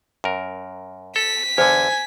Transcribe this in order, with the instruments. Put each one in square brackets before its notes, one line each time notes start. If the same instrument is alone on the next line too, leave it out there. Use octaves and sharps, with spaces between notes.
[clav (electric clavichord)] F#2 A#4
[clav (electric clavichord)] A4 [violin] B6
[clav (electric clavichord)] E2 D3 [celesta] C5 [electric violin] G#5